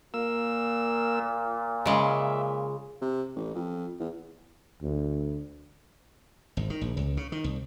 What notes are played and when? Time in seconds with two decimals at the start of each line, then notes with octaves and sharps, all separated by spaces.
0.14 A#2 A#3 E6
1.86 C#3 G#3 E5
3.01 C3
3.36 A1
3.55 F2
3.99 E2
4.82 D2
6.57 G#1
6.70 D#3
6.81 A#1
6.97 C#2
7.17 C#3
7.32 D#3
7.44 C2